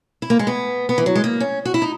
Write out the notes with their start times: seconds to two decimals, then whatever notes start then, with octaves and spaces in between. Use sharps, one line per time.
0.22 E4
0.30 A#3
0.39 G#3
0.47 B3
0.89 B3
0.98 E3
1.06 F#3
1.15 G#3
1.24 A#3
1.40 C#4
1.65 F#4
1.74 E4
1.82 D#4